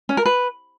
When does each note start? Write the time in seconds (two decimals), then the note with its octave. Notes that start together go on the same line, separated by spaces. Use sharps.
0.09 C#4
0.17 A#4
0.25 B4